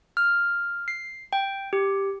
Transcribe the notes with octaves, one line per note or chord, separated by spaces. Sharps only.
F6
C7
G5
G4